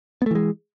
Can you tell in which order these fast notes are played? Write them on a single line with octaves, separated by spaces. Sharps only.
B3 A3 E3 G#3